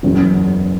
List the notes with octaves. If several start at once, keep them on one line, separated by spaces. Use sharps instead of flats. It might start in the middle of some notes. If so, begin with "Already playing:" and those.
F#1 E2 C#3 F#3